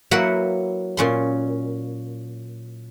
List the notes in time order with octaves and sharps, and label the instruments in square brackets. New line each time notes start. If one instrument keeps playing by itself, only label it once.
[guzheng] F#3 A#3 E4 F#4 B4 F#5
A#2 C#4 C6